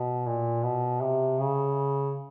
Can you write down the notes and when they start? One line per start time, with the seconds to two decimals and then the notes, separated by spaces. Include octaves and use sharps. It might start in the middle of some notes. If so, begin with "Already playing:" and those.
Already playing: B2
0.26 A#2
0.63 B2
1.01 C3
1.39 C#3